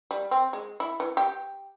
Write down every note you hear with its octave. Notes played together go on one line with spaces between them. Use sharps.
G3
C4
G#3
E4
E3
G4